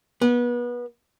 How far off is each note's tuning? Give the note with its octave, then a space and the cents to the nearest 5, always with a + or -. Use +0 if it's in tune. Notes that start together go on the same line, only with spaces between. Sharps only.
B3 -25